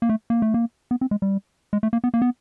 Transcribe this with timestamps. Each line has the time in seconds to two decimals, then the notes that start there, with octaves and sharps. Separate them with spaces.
0.02 A#3
0.09 A3
0.30 A#3
0.42 A3
0.54 A#3
0.91 B3
1.01 C4
1.11 G#3
1.22 G3
1.73 G#3
1.83 A3
1.93 A#3
2.04 B3
2.14 A#3
2.22 B3